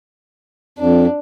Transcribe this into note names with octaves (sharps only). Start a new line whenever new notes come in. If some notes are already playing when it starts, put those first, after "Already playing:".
F2 D4